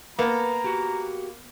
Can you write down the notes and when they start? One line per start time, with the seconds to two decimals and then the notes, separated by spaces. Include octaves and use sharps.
0.19 A#3 B3 A4 A#5
0.64 F#4 G4